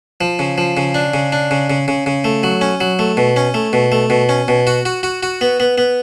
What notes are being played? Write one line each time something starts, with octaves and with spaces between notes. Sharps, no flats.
F3
C#3
F3
C#3
D4
C#3
D4
C#3
C#3
C#3
C#3
A3
F#3
C#4
F#3
A3
B2
C#4
A3
B2
A3
B2
C#4
B2
F#4
F#4
F#4
F#4
B3
B3
B3